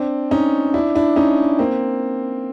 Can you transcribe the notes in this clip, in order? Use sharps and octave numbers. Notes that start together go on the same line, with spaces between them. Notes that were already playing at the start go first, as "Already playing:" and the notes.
Already playing: C4 D4
C#4 D#4
D4 E4
D4 E4
C#4 D#4
A#3 C4